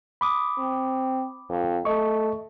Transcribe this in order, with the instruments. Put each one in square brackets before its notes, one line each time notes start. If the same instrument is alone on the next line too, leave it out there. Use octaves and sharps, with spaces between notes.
[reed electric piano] B5 D6 D#6
[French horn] C4
F2
[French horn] A3 [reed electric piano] D#5 C#6